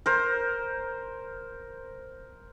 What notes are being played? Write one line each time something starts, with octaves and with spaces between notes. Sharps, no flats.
A#4 C5